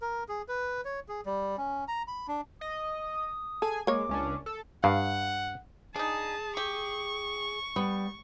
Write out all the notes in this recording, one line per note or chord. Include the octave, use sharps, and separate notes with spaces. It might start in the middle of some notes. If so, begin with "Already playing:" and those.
A#4
G#4
B4
C#5
G#4
G3
C#4
A#5
B5
D4
D#5 D#6
G#4 A4 G#5
G#3 A#3 C#5 D6
C#2 C#4 D4
A4
G2 F5 F#5
D4 D#4 G#4 A5
G4 C#6
G3 B3